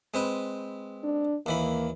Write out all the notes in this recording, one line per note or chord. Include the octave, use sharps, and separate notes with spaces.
G#3 C4 B4
D4
D#2 E3 A#3 B5